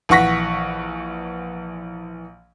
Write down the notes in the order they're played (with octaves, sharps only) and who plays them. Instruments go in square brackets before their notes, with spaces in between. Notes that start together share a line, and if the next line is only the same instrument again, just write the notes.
[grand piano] A#1 E3 F#5 C#6 A#6 B6